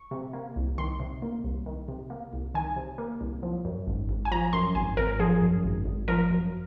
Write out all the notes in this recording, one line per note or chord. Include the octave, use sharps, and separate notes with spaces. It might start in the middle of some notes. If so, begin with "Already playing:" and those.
Already playing: C#6
C3
A#3
C2
D#3 C6
C3
A#3
C2
D#3
C3
A#3
C2
D#3 G#5
C3
A#3
C2
F3
F#2
G#1
G#1
G#5
F3 A#5
F#2 C6
G#1 G#5
G#1 A#4
F3 G#4
F#2
G#1
G#1
F3 A#4
F#2